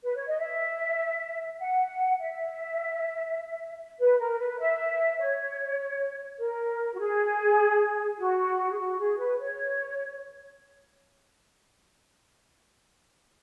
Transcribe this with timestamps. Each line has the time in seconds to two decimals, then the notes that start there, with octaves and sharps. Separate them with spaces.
0.04 B4
0.15 C#5
0.28 D#5
0.39 E5
1.60 F#5
2.19 E5
3.99 B4
4.19 A#4
4.39 B4
4.59 E5
5.18 C#5
6.39 A#4
6.94 F#4
6.98 G#4
8.18 F#4
8.70 G#4
8.78 F#4
8.99 G#4
9.18 B4
9.38 C#5